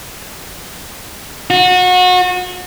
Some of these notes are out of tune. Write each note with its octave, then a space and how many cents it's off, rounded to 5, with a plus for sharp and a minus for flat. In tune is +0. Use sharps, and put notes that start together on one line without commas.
F#4 -30